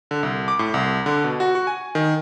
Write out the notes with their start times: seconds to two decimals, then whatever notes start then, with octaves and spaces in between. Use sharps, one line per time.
0.11 D3
0.23 C2
0.48 D6
0.59 A2
0.74 C2
1.06 D3
1.24 B2
1.40 F#4
1.55 F#4
1.67 G#5
1.95 D#3